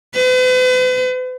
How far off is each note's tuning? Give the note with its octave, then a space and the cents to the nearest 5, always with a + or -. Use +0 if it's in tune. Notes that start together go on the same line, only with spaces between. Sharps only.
B4 +45